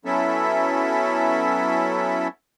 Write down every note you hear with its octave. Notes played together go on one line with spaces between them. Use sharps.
F#3 B3 C#4 E4 A4 E5